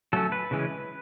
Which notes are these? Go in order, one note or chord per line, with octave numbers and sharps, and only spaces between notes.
F#3 A3 C#4 A4
B4
C#3 E3 G#3 C#4